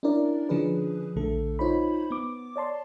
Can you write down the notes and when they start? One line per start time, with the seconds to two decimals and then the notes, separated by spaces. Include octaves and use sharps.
0.03 C#4 D4 E4 A#4 D5
0.49 D3 F3 C#4 D4 G#4 B4
1.16 A#1 D3 A3 A4
1.59 D#4 F4 C5 C#5 B5
2.11 B3 D6
2.56 C#5 D5 A5 C6